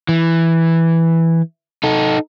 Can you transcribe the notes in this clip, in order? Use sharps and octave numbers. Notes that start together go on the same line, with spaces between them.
E3
D#4 A4